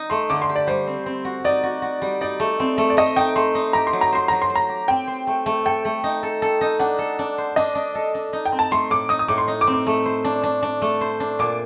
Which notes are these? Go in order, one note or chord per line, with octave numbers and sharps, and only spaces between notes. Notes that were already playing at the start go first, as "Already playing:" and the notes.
Already playing: D#4
A3 C6
D3 D6
C6
G4
D5
G3 C5
C4
C4
F#4
D#4 D5
F#4
F#4
G3
D#4 D5
A3
C4
A3
D5
A3 D#5
D#4 G5
A3 C6
D#4
G4 A#5
C6
F#3
A#5
C5 C6
F#3 A#5
C6
C5
A#5
G4
C4 G5
C5
A3
A3
A4 G5
A3
D#4
A4
A4
D#4
D4 F#5
A4
D4
C5
D4 D#5
D4
A4
D4
D#4
G5
C4
A5
A3 C6
A2 D6
D#4 D#6
D#6
A2 D6
C6
D#4
D6
C4
D6
A3
C5
D4
D4
D4
A3
C5
D4
A#2 D6